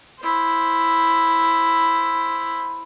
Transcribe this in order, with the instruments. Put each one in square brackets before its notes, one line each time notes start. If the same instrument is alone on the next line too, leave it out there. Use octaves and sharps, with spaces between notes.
[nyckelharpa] E4 C5